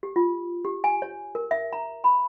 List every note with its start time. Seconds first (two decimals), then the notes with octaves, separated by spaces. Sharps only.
0.03 G4
0.16 F4
0.65 G4
0.84 G#5
1.02 C#5
1.35 A#4
1.51 E5
1.73 A#5
2.04 B5